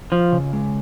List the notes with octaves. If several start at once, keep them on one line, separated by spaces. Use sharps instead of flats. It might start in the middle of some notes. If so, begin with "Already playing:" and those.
F3 F4
C#3
G#3